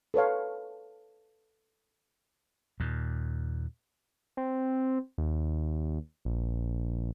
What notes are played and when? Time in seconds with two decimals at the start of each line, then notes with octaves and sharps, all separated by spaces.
0.14 A4 B4 C#5 F5
2.80 D#2 A#2
4.37 C4
5.18 D#2
6.25 A#1